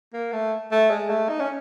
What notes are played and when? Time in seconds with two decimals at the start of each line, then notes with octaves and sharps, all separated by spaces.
0.13 A#3
0.33 A3
0.71 A3
0.90 G#3
1.09 A3
1.29 D#4
1.40 C#4